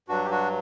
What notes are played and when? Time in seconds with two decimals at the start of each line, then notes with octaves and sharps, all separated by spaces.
0.09 G2 F#3 D4 F#4
0.25 G4
0.31 D4 F#4